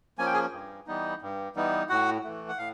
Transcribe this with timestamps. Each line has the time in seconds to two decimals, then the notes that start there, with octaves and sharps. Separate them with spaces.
0.18 F3 A#3 C#4 G#5
0.26 G5
0.34 G#4 G#5
0.52 G2
0.87 E3 G3 B3 D#4
1.22 G2
1.56 E3 G3 B3 D#4
1.89 A2 F#4 F#5
2.24 E3 A3
2.49 F#5
2.58 A2 F5